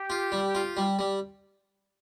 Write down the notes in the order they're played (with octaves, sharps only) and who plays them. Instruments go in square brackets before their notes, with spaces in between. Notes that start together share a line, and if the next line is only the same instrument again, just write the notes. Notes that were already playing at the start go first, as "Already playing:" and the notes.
Already playing: [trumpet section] G4
[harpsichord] F4
G3
F4
G3
G3